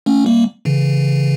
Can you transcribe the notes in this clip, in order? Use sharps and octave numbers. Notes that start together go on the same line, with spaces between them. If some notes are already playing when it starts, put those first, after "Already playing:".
A3 C#4
G3 A#3
C#3 E3